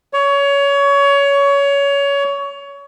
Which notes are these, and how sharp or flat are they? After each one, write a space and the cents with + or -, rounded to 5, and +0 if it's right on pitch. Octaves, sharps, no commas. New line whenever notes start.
C#5 +20